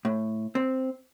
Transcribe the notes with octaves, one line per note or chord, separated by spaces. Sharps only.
A2
C4